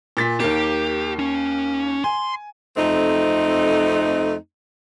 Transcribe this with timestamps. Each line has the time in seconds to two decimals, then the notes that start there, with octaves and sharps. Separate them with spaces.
0.17 A#2 A6 B6
0.40 D#2 A#3 G4
1.19 C#4
2.04 G#5 C6
2.77 F2 A3 C4 D#4